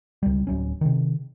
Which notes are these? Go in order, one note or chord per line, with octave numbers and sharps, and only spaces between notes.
C#2 G3
D1 F#3 C#4
C3 D#3